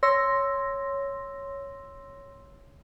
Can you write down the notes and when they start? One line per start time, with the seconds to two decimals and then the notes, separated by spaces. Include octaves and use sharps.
0.03 C#5 C6 E6 A#6